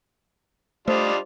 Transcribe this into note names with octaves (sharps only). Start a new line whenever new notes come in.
G3 A3 D4 F4 C5 D5 D#5